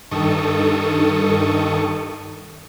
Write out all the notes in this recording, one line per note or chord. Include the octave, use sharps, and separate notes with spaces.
G2 D#3 A4 C#6 D#6